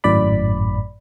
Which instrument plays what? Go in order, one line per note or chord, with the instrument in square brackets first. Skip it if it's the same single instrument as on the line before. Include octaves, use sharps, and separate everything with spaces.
[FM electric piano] G#1 F#2 A2 D5 B5